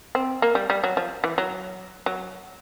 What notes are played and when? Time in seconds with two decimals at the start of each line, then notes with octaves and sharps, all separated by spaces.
0.15 C4
0.42 A#3
0.55 G3
0.70 G3
0.84 F#3
0.97 F3
1.24 E3
1.38 F#3
2.06 F#3